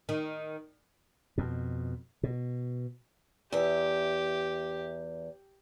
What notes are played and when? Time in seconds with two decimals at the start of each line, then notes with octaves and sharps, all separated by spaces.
0.09 D#3
1.38 F2 B2
2.23 B2
3.52 E2 G4 E5